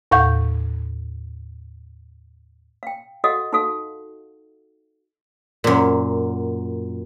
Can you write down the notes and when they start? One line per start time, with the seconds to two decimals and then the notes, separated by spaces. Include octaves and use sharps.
0.11 D#2 A2 F5 F#5 C#6 G6
2.83 F5 G5
3.24 F#4 A4 D#5 F5 F#5
3.53 D#4 F#4 A4 F5
5.64 F#2 A#2